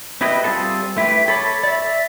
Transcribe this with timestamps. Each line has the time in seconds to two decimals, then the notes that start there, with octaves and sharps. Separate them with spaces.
0.21 C4 E4 G4 B4 D#5
0.44 G3 C4 F4 G#4 A4
0.97 A3 E4 G4 B4
1.28 A4 C#5 B5 D6
1.63 D5 E5